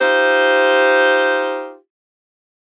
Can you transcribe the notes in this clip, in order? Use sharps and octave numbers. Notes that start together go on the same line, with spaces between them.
D#4 F4 G4 C5